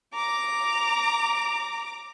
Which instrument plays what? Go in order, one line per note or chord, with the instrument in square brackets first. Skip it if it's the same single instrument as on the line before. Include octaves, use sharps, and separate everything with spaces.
[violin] A#5 D6